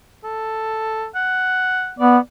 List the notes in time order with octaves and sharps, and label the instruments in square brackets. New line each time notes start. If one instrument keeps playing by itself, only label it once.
[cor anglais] A4
F#5
[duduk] B3 [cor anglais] D5